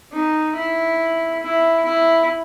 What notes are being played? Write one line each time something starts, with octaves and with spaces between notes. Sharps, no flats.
D#4
E4
E4
E4